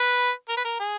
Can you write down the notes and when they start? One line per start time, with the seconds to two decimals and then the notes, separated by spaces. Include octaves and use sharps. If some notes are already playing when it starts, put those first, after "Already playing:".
Already playing: B4
0.49 A#4
0.57 B4
0.65 A#4
0.80 G#4